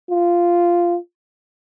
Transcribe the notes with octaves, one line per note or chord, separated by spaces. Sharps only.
F4